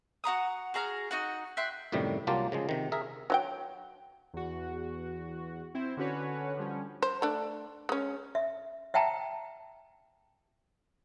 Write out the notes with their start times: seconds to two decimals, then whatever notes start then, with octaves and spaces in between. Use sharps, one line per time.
0.24 F#4 F#5 A#5 D#6
0.74 F#4 G#4 A#5 F6
1.11 D#4 F#4 F#5
1.57 E5 G5 C6 F#6
1.92 F#2 A2 C3 D#3 G3
2.27 C2 F#3 A#3 F4 G4 A5
2.52 C#3 F3 G#3
2.69 C3 D#3
2.92 G#4 A#4 E5
3.30 F#3 F4 G5
4.33 E2 F#4
5.74 C4 E4 C5
5.97 D3 C#4 F#4 B4 C#5
6.57 D3 F3 G3 C#4
7.02 C5
7.22 A3 D4
7.89 G#3 C#4
8.35 E5
8.94 E5 F#5 G5 A5 A#5